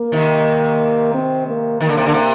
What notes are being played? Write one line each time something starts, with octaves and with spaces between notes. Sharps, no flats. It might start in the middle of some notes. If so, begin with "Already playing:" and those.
Already playing: A#3
C3 D#3
C4
A#3
D#3 A#3
D3
C3
D3
C3